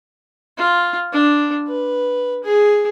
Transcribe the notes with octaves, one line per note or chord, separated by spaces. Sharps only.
F4
D4
B4
G#4